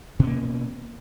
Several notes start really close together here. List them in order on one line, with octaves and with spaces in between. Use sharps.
B2 C#4 A#3